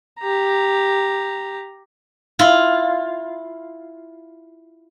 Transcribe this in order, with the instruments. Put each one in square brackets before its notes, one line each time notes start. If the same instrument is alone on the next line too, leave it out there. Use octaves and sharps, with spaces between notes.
[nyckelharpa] G4 A#5
[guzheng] E4 F4